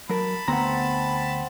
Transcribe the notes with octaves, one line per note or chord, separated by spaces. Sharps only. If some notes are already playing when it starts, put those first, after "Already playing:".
F#3 A#4 A5 B5
D2 B3 C4 F#5 A#5